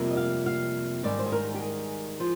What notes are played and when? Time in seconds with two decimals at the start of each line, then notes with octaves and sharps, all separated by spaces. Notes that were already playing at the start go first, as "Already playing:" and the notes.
Already playing: F2 C3 G3 A#3
0.10 D#5
0.17 F5
0.46 F5
1.03 G#2 D#3 G3 D5
1.19 C5
1.26 G#4
1.32 A#4
1.47 G#4
1.54 G4
1.62 G#4
2.20 F3